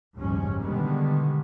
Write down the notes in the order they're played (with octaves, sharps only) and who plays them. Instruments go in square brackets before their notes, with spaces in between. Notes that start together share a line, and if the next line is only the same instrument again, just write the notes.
[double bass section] F#1 D#2 G#2 F3 G3 C#4
B2 D3 D#3 G3 G#3 B3